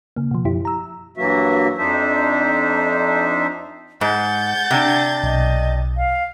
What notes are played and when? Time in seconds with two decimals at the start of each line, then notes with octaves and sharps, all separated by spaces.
0.16 C#3 A#3
0.31 B2 F3
0.45 F#2 F3 E4 G4
0.65 A#5 E6
1.17 G2 E3 F#3 A#3 F#4 E5
1.78 F2 D4 D#4 C5 E5
4.01 G#2 F#5 G6 A6
4.71 C3 D4
5.23 B1 D#5
5.97 F5